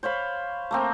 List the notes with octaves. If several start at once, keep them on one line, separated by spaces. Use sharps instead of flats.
C5 C#5 F5 B5
A3 A#3 C4